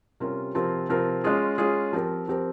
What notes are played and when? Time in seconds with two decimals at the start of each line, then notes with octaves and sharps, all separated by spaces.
0.20 C3 G3 C#4 F4 A#4
0.55 C3 F3 C4 F4 A#4
0.89 C3 F3 C4 F4 A#4
1.24 G#3 C#4 F4 G#4
1.58 G#3 C#4 F4 G#4
1.93 F3 C4 G4 A#4
2.28 F3 C4 G4 A#4